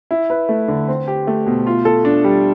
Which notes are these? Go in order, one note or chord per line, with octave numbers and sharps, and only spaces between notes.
E4
B4
A3
D3
C4
G4
A3
B2
F4
A4
D4
G3